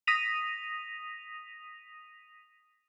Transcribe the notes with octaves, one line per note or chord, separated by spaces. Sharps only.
D#6 A#6 B6 D#7 F7